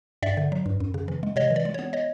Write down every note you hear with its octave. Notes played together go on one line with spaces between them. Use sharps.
G2 D5 E5
D3
F#3
G2
F#2
C#3
E3
G#3
C3 C#5 D#5
E3
D5
G#3
B3 C#5
C#5 D#5